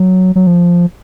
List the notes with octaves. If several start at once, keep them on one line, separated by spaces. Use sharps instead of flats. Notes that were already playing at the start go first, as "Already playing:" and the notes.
Already playing: F#3
F#3
F3